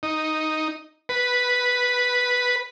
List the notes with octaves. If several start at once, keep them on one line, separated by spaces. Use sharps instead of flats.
D#4
B4